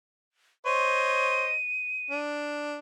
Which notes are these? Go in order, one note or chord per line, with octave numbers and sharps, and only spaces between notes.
C5 C#5 D#5 D#7
D4